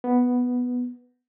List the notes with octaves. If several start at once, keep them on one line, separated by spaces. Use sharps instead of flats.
B3